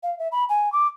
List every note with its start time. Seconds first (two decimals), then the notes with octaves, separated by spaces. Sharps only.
0.03 F5
0.19 E5
0.32 B5
0.49 G#5
0.72 D6